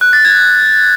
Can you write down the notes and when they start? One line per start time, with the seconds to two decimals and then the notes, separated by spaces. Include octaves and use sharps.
0.01 F#6
0.13 A6
0.25 G#6